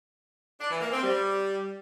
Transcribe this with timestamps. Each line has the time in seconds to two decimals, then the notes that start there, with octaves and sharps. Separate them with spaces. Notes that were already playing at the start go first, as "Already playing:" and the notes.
0.60 D4
0.70 E3
0.81 A#3
0.92 C4
1.03 G3